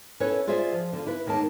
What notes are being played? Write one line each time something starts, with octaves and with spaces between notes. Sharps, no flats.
C#4 E4 A4 B4 C#5
F4 G#4 C5 D5 E5
F3
D3 F4
E4 B4
D#2 D#3 G#3 A#3 A5